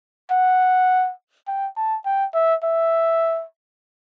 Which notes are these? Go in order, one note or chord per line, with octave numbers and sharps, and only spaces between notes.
F#5
G5
A5
G5
E5
E5